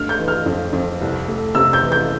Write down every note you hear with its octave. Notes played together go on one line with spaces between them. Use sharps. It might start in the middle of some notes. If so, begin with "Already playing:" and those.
Already playing: G2 A3 F6
G6
E3
F6
F2
F2
C2
A3
C3 E6
G6
E3
G6